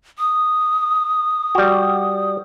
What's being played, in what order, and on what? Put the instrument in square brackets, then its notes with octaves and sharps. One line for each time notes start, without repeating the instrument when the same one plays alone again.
[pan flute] D#6
[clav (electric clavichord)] G3 F#4